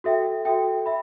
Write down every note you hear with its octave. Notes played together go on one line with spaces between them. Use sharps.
F#4 A4 E5 G5
F#4 A4 E5 G5
E5 B5